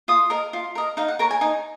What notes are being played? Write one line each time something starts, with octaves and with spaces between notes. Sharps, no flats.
F4 D#6
A#4 D#5
F4
A#4 D#5
D#4 F5
F#5
A#4 C#5 A#5
G#5
D#4 G#5